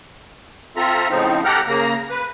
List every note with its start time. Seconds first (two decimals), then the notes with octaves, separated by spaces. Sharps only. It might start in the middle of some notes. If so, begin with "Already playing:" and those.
0.76 C4 F4 A4 E5 A#5
1.09 A2 C#3 F3 C4 D#4
1.44 G4 A4 F#5 G5 A#5 F6
1.66 C#3 A#3 A#5
2.10 B4